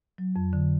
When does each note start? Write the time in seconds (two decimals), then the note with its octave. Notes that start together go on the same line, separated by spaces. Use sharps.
0.18 F#3
0.36 F2
0.53 D3